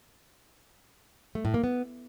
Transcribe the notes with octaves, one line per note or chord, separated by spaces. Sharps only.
A3
A2
A#3
B3